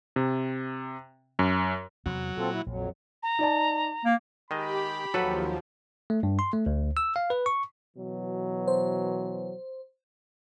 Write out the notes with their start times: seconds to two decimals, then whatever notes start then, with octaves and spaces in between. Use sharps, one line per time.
0.16 C3
1.39 F#2
2.06 E2 C3 F#3 B3
2.37 A#2 C4 F4 A4
2.51 E4
2.66 A#1 F2 F#3
3.23 A#5
3.39 D#4 D5 A5
4.05 A#3
4.51 D#3 G#3 G4 D#5 B5
5.14 D#2 F3 F#3 A4 B4 F#5
6.10 A3
6.23 G2
6.39 C6
6.53 A3
6.66 D2
6.97 E6
7.16 F5
7.30 B4
7.46 C#6
7.97 B2 E3 F#3
8.68 C5